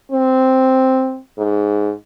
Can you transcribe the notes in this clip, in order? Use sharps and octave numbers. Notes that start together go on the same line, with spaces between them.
C4
G#2